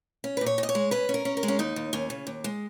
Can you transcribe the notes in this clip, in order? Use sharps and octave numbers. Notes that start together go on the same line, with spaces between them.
C#4
B4
A#2
C#5
A#2
D#5
C#5
G#3
C#4 B4
C#4
A#4
C#4
A#4
G#3
C#4
D#2 D#4
D#2
D#2 C#4
C#3
D#2
G#3